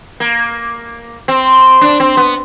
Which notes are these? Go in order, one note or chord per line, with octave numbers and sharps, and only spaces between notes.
A#3
C4
D4
C4
B3